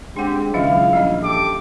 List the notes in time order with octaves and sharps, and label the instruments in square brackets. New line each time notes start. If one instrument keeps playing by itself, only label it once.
[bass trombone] G#3 [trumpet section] C4 G4 [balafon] D4 F#5
[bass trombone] C#2 [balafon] D#3 F#3 E5 [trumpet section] E4 F5
[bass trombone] A#1 [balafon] G3 C#4 D#5
[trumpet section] G4 A4 D6